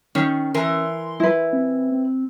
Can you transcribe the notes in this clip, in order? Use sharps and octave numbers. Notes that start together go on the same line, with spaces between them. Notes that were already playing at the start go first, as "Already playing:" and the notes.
D#3 C#4
E3 A#4 C6
E4 B4
C4
C4